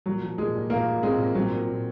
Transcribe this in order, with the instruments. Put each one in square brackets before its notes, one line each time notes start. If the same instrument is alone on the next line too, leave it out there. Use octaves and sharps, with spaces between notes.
[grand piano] A#2 [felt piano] F#3
[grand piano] F3
[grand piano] A#2 [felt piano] G#3
[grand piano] A#2
[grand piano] A#2 [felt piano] A#3
[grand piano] A#2
[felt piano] G#3 [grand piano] C4
[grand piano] A#2
[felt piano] F#3 [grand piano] C4
[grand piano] A#2
A#2